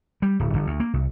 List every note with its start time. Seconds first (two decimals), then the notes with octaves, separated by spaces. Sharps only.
0.22 G3
0.40 D1
0.54 G1
0.67 D2
0.80 A#3
0.93 C2